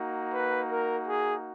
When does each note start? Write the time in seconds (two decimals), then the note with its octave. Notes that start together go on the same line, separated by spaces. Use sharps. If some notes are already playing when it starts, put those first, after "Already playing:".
Already playing: A#3 D#4 F#4
0.33 B4
0.70 A#4
1.08 G#4